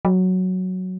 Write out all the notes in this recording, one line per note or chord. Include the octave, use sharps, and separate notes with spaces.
F#3